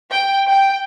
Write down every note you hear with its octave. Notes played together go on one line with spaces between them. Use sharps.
G5
G5